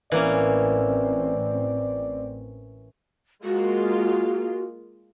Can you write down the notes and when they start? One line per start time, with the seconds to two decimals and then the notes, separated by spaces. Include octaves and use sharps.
0.12 A1 E3 A#3 C4 C#4 D5
3.44 G#3 A#3 F4 F#4